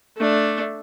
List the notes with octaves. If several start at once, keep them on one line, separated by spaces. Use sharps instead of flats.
A3 D4